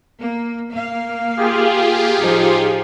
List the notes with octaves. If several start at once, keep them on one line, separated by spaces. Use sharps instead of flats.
A#3
A#3 F5
F4 G4 G#4
A2 F3 D#4